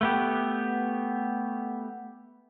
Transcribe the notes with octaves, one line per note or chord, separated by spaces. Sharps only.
A3 B3 G4